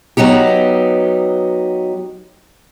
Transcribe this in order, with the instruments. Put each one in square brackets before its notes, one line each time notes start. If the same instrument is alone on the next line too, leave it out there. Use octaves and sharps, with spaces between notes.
[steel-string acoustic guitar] F#3 B3 D#4 G4